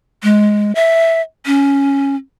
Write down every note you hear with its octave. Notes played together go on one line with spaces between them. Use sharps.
G#3
E5
C#4